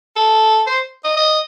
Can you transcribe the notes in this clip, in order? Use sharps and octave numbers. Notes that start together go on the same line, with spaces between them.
A4
C5
D#5
D#5